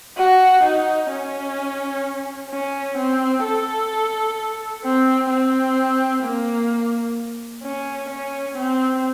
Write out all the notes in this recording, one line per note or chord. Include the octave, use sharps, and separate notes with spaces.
F#4
D#4
C#4
C#4
C4
A4
C4
C4
A#3
C#4
C#4
C4